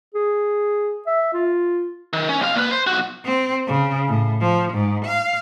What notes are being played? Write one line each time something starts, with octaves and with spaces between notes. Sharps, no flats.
G#4
E5
F4
D#3
C#4
B1 F5
A#2 B4
C5
B1 F#4
C4
C#3
A2
F3
G#2
F5